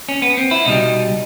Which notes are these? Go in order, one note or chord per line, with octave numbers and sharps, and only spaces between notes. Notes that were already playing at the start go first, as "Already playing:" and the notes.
C#4
B3
C4
E4
C2 B2 G3 D#4